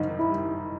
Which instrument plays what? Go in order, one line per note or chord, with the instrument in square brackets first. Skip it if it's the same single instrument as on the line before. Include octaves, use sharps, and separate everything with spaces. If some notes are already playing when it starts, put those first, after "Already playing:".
Already playing: [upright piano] F#1 F#2 G3 [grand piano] D#4
[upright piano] D#3
[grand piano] E4
[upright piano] G3